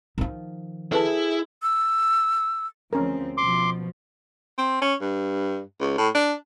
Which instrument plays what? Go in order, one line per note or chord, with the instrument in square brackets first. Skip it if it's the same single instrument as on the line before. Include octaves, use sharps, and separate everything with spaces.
[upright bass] D#3 F3
[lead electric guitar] E4 [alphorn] G#4 [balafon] A4 B4 A5
[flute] E6
[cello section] D2 F3 C4 [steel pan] C#4 A#4
[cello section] B2 F3 [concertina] C6 D6
[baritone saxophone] C4
C#4
G2
C#2
A2
D4